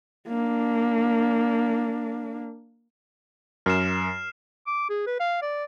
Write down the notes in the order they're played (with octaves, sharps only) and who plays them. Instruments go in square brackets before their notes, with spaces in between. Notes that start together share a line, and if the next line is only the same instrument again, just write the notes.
[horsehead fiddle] A#3 D4
[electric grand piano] F#2 A#4 [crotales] F6 C7 E7
[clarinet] D6
G#4
B4
F5
D5